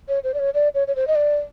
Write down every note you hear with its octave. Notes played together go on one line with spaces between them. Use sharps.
C#5
C5
D5
C#5
D5
C#5
C#5
C5
D#5
D5